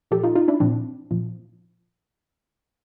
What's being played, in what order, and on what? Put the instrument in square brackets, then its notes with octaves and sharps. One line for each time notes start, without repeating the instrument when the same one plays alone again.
[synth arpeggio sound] A#2 F3 G4 A4
D#4 F4
D#4 F4
D4 E4
A#2 F3 C4 D4
A#2 F3